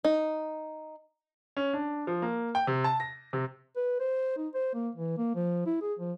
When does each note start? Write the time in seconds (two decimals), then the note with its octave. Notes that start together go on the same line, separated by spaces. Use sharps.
0.05 D#4
1.57 C#4
1.73 D4
2.07 F3
2.22 A#3
2.55 G5
2.67 C3
2.84 A5
3.00 A#6
3.33 C3
3.76 B4
4.00 C5
4.37 D#4
4.54 C5
4.74 A#3
4.95 E3
5.17 A#3
5.35 F3
5.66 E4
5.81 G#4
5.99 F3